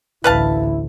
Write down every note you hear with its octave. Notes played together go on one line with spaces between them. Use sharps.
A1 D2 E4 B4 F5 A5